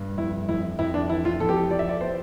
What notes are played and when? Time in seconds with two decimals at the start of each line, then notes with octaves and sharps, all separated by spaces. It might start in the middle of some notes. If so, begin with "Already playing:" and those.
Already playing: G2
0.18 F2 E4
0.49 F2 E4
0.79 F2 E4
0.94 D4
1.09 E3 E4
1.25 F4
1.40 F2 A4
1.49 G4
1.56 A4
1.71 F3 D5
1.79 E5
1.89 D5
2.01 B3 C5